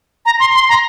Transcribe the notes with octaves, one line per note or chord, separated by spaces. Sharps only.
A#5
C6
C6
A#5